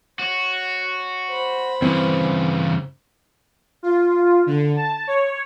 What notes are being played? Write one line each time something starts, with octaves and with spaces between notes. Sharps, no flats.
F#4 C#5
C5 B5
G2 C#3 E3 C4
F4
D3
A5
C#5